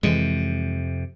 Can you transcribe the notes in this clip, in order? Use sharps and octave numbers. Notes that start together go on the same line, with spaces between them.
F2 C3 E3 G#3